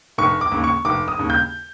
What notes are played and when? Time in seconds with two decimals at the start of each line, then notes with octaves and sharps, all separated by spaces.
0.18 F1 C#6
0.41 D6
0.52 D#2 C#3
0.64 C#6
0.85 F1 D6
1.08 D#6
1.19 D#2 C#3
1.30 G6